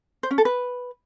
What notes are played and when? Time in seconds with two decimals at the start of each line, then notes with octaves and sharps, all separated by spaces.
0.23 C5
0.31 C#4
0.38 A4
0.45 B4